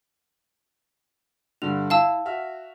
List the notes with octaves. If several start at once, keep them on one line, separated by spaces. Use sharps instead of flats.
G2 D3 F7
E4 F5 A5 E6
F#4 E5 F6